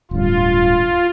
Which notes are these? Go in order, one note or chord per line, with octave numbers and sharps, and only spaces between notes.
D1 G2 F4